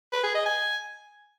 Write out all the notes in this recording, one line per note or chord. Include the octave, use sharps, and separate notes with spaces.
B4
G#4
D#5
G#5